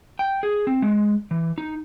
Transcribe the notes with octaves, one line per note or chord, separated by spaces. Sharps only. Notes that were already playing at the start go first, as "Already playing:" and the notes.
G5
G#4
C4
G#3
E3
D#4